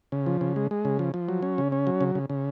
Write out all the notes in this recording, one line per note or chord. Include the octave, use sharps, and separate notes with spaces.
C#3
F3
C#3
G#3
G#3
C#3
F3
F3
F#3
C#4
C#3
C#4
F#3
C#3
C#3
C#3